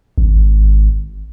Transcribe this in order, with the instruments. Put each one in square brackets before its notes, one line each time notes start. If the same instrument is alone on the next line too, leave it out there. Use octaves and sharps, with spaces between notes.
[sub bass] G#1